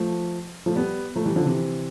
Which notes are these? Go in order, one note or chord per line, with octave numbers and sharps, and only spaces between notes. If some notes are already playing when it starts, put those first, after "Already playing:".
Already playing: F3 A3
F3 A3
G3 B3
F3 A3
E3 G3
D3 F3
C3 E3